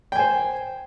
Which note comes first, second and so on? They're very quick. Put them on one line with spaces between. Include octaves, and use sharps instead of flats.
G5 G#5 C5